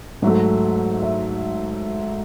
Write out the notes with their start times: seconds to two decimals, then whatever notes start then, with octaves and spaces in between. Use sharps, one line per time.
0.22 G#2 F#3 A3 E5
1.03 E5